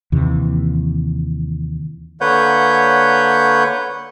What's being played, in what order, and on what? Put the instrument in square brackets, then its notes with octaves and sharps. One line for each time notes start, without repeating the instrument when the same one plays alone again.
[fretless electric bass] D#2 C3 E3
[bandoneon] D3 A#3 B4 C#5 F#5 G6